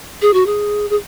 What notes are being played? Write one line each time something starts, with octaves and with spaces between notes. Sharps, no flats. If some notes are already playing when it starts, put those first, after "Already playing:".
G#4
F#4
G#4
G#4